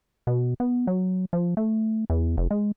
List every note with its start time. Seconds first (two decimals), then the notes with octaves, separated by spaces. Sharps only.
0.27 B2
0.60 B3
0.87 F#3
1.33 F3
1.57 A3
2.10 E2
2.37 F1
2.51 G#3